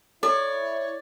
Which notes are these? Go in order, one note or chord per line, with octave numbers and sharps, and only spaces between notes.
E4 A4 C#5 D5